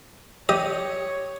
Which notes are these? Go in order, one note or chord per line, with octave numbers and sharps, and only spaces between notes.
G4 C#5 D#5